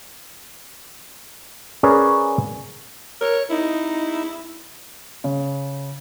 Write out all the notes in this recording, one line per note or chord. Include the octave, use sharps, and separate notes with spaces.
C#4 G#4 A#4 B4 C#5 D5
A#4 C#5
D#4 E4
C#3